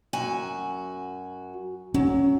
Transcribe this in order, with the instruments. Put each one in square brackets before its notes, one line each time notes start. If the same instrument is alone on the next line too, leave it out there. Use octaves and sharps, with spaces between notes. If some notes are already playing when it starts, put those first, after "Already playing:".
[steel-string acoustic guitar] F#2 F#4 G#5
[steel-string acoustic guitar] F#3 [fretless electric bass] C#4